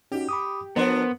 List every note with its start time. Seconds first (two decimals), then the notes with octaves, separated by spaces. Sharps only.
0.12 C#4 D#4 F#4 G4
0.29 B5 D6 D#6
0.76 F3 B3 D4 A#4 C5 C6